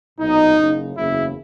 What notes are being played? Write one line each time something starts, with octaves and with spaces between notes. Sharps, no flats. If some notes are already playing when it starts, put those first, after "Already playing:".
B1 A#2 F#3 D#4
F#1 F#2 C#3
F#1 E2 C#3 E4